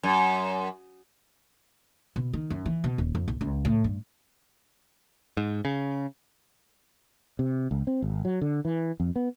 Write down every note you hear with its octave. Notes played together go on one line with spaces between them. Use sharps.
F#2
B2
D#3
F#2
E3
B2
D#1
F2
B1
C#2
A2
G2
G#2
C#3
C3
C#2
C4
G#1
F#3
D3
E3
F2
B3